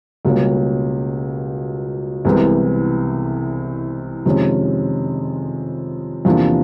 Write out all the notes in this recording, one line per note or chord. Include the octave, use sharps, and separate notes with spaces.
C#2 B2 G3 A#3 C#4
C2 C3 E3 G#3 B3
F2 C3 D#3 G#3 C#4
E2 C3 F3 A#3 D4